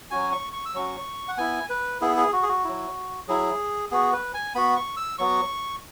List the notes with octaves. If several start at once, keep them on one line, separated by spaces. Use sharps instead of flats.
F#3 C#4 F#4 G#5
C#6
C#6
E6
F#3 C#4 F#4 C#6
F#5
B3 E4 G#5
B4
B3 E4 G#4
G#4
F#4
G#4
F#4
F#3 E4
F#3 E4 G#4
B3 F#4 G#4
B4
G#5
B3 F#4 B5
C#6
E6
F#3 B3 F#4 C#6